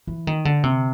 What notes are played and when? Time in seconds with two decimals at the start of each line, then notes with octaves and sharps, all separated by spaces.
0.07 E3
0.27 D#3
0.45 D3
0.64 C3